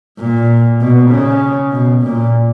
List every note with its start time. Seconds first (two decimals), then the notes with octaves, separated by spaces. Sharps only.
0.19 A#2
0.81 B2
1.11 C#3
1.72 B2
2.02 A#2